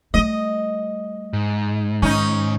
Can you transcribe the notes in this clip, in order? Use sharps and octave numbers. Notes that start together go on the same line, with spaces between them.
G3 A3 D#5
G#2
D#3 C#4 D#4